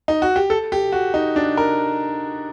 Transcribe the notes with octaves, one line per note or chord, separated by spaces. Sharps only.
D#4
F#4
G4
A4
G4
F#4
D#4
D4
A#4